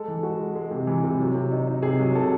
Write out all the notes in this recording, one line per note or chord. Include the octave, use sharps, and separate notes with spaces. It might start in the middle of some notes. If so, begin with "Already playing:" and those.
Already playing: G#3 A4
E3
G#3 F#4
G#3
G#3
C3
E3
C3
F#3
C3
D#4
D#4
C3 G#4
F#3
C3 A4